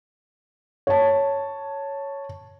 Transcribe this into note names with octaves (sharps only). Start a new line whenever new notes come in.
C#5 A5